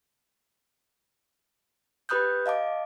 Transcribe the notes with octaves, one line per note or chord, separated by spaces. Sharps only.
G4 B4 B5 D#6 F#6 G6
D#5 F5 A5 D6